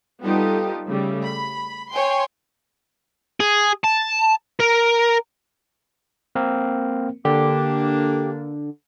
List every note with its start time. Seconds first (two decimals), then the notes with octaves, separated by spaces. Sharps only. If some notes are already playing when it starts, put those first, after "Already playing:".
0.22 G3 B3 D#4 F4 G4 A4
0.87 C#3 G3 A3
1.23 B5
1.92 C#5 G5 G#5 C6
3.40 G#4
3.84 A5
4.60 A#4
6.35 A#3 C4 A#4
7.25 D3 A#3 D4 G4